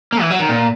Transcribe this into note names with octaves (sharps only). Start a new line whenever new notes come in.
A#3
E3
F#3
D#3
A#2